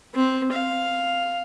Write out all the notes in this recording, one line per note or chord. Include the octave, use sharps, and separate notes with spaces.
C4
F5